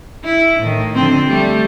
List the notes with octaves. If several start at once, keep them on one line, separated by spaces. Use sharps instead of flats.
E4
A2 D#3
D3 F3 C4
G3 A3